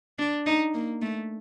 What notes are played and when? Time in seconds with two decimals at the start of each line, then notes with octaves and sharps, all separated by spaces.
0.19 D4
0.46 D#4
0.74 A#3
1.02 A3